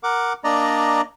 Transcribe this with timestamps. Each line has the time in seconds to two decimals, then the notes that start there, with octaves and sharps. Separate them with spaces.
0.03 A#4 F#5 D6
0.44 A#3 D4 D5 D#5 A#5